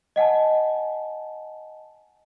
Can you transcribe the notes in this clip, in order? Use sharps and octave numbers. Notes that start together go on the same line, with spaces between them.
D#5 F#5 G#5 A5